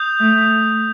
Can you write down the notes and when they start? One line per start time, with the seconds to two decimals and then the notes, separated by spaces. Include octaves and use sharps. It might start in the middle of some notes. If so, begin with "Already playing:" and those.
Already playing: D#6 G6 F7
0.20 A3